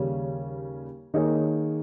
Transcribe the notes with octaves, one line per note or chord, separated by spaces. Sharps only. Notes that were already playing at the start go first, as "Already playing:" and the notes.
Already playing: D#2 C#3 G3 C#4
D#3 A#3 D#4 G#4 C#5